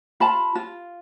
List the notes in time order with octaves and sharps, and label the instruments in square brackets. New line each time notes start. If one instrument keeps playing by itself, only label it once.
[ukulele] F4 A5 B5
F4